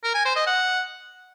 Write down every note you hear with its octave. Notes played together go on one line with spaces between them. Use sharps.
A#4
G#5
C5
D#5
F#5